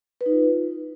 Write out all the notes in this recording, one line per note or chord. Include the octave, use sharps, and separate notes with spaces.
B4
D#4
F4